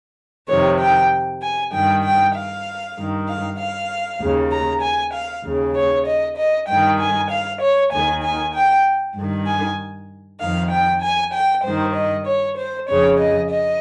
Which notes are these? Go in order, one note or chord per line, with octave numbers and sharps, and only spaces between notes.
F2 C3 D#3 C#5
G5
G#5
G2 D#3 G5
G5
F5
G2 D#3
F5
F5
D#2 C#3
A#5
G#5
F5
D#2 C#3
C#5
D#5
D#5
G2 D#3 G5
G#5
F5
C#5
D#2 D#3 G#5
G#5
G5
G2 D#3
G#5
F2 D#3 F5
G5
G#5
G5
G2 D#3 C5
D#5
C#5
C5
F2 C#3 C#5
D#5
D#5